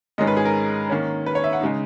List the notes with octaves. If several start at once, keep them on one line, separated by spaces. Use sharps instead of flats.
G#2 D#3 G#3 C#4 D#5
B4
G#4
A#4
D#3 A#3 C#4
B4
C#5
E5
F#5
C#3 G#3 D#4